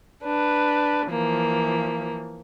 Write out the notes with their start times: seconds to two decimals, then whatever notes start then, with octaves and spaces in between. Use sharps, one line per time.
0.24 D4 B4
1.08 E3 F3 A#3